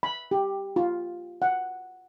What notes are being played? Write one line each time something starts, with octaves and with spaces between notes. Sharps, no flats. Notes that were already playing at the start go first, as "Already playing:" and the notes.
B5
G4
F4
F#5